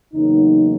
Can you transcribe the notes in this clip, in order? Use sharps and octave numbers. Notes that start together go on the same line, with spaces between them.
E2 C#3 F#3 A#3 D#4